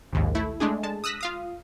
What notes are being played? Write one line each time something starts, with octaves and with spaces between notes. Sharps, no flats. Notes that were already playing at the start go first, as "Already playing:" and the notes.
A#1 D#2 G#2
A3 E4
G#3 A3 D4 G#4
G#3 A5
D#6 E6 F#6 A#6 B6
F4 F5 D#6